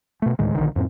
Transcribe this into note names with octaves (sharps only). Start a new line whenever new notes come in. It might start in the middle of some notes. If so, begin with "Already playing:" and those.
B2 A3
D2 A2 D#3 G#3
A#1 B2 D3 D#3
F2 A2 B3 C4